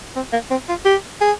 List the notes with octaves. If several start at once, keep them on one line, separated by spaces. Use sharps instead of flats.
C4
A#3
C4
F4
G4
G#4